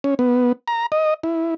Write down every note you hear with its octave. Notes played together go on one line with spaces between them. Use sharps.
C#4
B3
A#5
D#5
E4